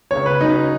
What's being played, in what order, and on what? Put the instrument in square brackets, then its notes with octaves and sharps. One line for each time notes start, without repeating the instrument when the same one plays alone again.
[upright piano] C#2 C#3 B3 [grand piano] C#5
[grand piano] B4
[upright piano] C#3 F#3 C#4 [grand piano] D#4